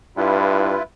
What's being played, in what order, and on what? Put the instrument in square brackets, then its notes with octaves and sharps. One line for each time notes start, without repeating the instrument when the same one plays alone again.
[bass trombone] G2 [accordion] E4 F4 B4